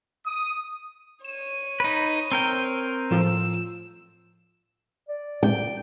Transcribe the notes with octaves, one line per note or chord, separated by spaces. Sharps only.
D#6
C#5 D#7 E7
D#4 B4
C4 A#4 G5
A2 F3 F4 E6
D5
G5